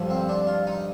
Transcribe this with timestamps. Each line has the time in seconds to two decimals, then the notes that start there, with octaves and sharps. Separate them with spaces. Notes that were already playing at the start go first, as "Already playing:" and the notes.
Already playing: G2 D3 F3
0.10 C4
0.29 D4
0.47 F4
0.67 D#4